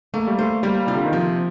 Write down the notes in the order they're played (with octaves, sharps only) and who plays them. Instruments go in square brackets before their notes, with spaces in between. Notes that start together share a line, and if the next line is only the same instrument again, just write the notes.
[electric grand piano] A3 [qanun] A#3
[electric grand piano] G3
[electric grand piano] A3 [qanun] C5
[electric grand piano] G3 [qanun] A#3
[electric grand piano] C3 [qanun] F4
[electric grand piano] D3
D#3
[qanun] C3 [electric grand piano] F3